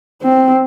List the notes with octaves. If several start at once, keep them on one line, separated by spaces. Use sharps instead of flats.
C4